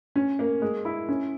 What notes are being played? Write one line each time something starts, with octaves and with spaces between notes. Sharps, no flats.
C#4
A#3
G#3
E4
C#4